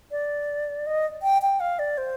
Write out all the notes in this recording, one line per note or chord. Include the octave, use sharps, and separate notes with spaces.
D5
D#5
G5
G5
F5
D5
C5